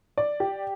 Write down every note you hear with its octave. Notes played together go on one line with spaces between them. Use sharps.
D5
G4